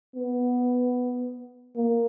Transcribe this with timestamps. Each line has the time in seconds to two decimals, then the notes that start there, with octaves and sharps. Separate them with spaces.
0.16 B3
1.76 A#3